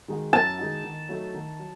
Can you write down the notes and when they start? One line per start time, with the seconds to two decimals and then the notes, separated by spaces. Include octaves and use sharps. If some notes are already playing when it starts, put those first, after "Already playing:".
0.08 D#3 G#3 D#4 F#4
0.33 F#2 A5
0.58 D#3 G#3 D#4 F#4
0.84 D#3
1.09 F#3 A3 D#4 F#4
1.34 D#3
1.59 F#3